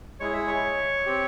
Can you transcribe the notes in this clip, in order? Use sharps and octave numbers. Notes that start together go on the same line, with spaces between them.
G#3 E4 G#4 C#5
E5
C#5
C4 G4